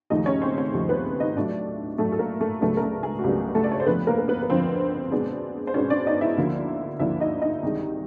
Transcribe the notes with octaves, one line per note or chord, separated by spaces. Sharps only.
D#2 C#3 F3 A3 D#4 D#5
C#4 C#5
C4 C5
C4 C5
D#2 C#3 F3 A3
B3 B4
D#4 D#5
A2 F#3 A3 D4 D5
A2 F#3 A3 A4
A4
A#3 A#4
A3 A4
C#2 C#3 F#3 A3 B3 D4 A4
A#4
A3 A4
G#3 G#4
F#4
C#2 C#3 F#3 G3 B3 D4 G4
A3 A4
D5
C#5
C5
F2 D3 F3 B3 B4
A#3 A#4
A#4
B3 B4
B4
F2 D3 F3 C4 C5
B2 G#3 B3 D4
C5
B2 G#3 B3 C#4 D4 C#5
D4 D5
D#4 D#5
E4 E5
D2 D3 F3 A#3 D4
D2 D3 F3 A#3 D4 E4 E5
D#4 D#5
D#4 D#5
C2 C3 D#3 G#3